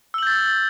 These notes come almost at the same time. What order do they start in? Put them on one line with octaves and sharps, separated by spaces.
E6 F#7 G6 A6